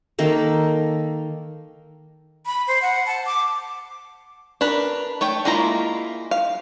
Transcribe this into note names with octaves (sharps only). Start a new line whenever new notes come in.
D#3 A#3 A4
B5
C5
F#5
A5
D6
D4 A#4 B4
A3 C#5 G5
G#3 A#3 E4 F4 A#5
F5